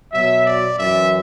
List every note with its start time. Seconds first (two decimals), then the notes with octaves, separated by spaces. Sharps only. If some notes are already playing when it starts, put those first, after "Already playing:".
0.13 B2 F#3 E5
0.45 D5
0.78 F#2 E3 E5